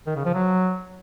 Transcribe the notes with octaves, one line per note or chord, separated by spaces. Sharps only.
D#3
C#3
F3
F#3